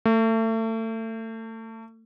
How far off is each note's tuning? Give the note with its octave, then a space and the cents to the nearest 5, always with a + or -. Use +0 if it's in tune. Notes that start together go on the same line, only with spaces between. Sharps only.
A3 +30